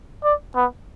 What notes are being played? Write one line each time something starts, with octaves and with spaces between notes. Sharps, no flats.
D5
B3